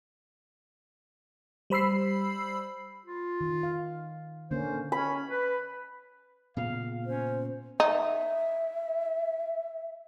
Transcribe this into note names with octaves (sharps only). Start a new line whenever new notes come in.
G3 C5 B5 E6 C7
F4
D#3
F5
D3 A#3 C#4 C5
C#4 B5
B4
A#2 C#3 B3 F5
C#4 C5
D#4 E5